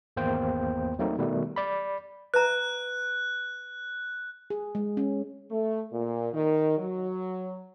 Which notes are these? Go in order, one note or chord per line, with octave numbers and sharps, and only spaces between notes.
G#1 E2 A#3 C5 G5
F#3 A3 A#3 C4 D#4
B2 D#3 G3 A3
D5 B5
B4 E5 A#5 F#6
G#4
G#3
C#4
A3
A#2
D#3
F#3